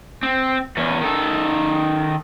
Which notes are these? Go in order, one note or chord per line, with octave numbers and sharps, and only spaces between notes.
C4
E2 C#4
D#3 A4